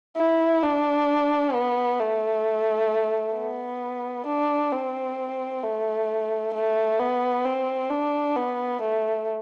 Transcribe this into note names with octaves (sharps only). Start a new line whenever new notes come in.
E4
D4
B3
A3
B3
D4
C4
A3
A3
B3
C4
D4
B3
A3